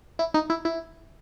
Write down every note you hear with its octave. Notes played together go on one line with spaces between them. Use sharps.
E4
D#4
E4
E4